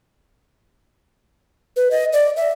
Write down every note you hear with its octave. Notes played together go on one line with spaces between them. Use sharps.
B4
D#5
D5
E5